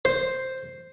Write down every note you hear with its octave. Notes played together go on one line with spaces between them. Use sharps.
C5